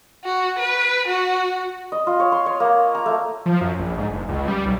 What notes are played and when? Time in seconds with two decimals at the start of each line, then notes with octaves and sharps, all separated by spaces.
0.25 F#4
0.59 B4
1.07 F#4
1.92 D#5
2.07 F4
2.20 C#5
2.32 C6
2.46 C#5
2.60 A#3
2.95 A#5
3.06 A3
3.46 F3
3.61 F#2
3.79 A#1
3.98 G#2
4.11 F#1
4.29 C#2
4.48 G3
4.66 B1